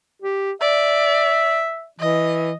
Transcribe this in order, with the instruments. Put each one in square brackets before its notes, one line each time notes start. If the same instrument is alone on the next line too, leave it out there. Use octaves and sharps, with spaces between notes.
[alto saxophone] G4
[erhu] D5 [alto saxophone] E5
[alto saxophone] E3 [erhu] D#5